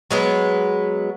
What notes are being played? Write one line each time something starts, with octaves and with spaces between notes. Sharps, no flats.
F#3 G#3 B3